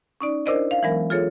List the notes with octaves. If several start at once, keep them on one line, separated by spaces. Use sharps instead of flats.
C#4 D#4 D5
D4 E4 A#4 C5 D5 D#5
F5
E3 F#3 G#3 B3 A#4
F4 G#4 A4 C#5